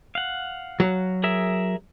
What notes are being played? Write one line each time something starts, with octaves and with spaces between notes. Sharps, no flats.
F5 F#5
F#3
G#4 A#4 E5